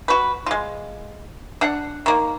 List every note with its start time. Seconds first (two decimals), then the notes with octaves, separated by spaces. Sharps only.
0.08 F#4 B4
0.46 G#3 F4
1.61 D4 F#5
2.06 D#3 A#3